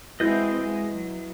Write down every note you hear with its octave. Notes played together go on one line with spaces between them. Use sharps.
G#3 C4 E4 F#4 B4 D#5 G6
G#3
F#3